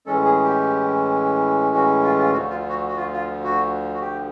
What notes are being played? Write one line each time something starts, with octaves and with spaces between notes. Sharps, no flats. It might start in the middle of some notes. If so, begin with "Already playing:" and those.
A2 E3 G#3 C#4 A4
G#4
G4
F#4
F4
F4
D2 D3 F3 F#4
F4
F#4
F#4
F4
F4
F#4
F#4
G4